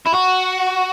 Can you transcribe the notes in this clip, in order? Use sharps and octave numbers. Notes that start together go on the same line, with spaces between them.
E4
F#4